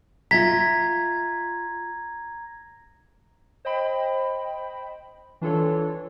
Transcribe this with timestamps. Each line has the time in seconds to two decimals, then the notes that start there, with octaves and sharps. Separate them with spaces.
0.31 F4 E5 F#5 A#5 G#6 A#6 B6
3.65 C5 D#5 G5 B5
5.41 E3 D4 F4 A4 C#5